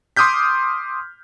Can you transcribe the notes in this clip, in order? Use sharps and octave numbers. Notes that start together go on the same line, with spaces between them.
C6 D6 D#6 F6 G6 B6